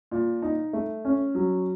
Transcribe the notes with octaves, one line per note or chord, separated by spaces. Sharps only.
A#2
D#4
A3
C#4
F#3